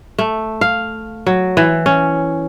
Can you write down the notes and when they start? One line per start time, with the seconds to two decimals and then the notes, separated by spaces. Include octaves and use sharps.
0.18 A3
0.61 F5
1.27 F#3
1.57 E3
1.86 C#4